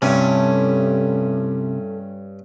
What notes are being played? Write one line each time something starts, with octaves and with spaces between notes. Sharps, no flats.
G2 C3 A3 C#4 E4 A4 G#5